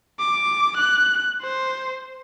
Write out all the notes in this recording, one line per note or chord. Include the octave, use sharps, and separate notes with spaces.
D6
F#6
C5